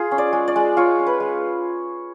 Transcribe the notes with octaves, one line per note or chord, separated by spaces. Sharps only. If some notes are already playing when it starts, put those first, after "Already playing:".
Already playing: F4 G#4
C#4
D5
G#3
D5
G#3
F4 C#5
C#4
B4
G#3